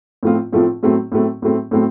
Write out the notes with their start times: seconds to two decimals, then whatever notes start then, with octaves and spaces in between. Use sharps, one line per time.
0.23 A2 F3 A3 C4 F4
0.53 A2 F3 A3 C4 F4
0.83 A2 F#3 A3 C4
1.12 A2 F#3 A3 C4
1.42 A2 F#3 A3 C4
1.71 A2 F#3 A3 C4